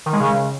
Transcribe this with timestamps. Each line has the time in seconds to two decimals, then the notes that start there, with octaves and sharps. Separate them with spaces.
0.06 D#3
0.13 G#3
0.20 C#3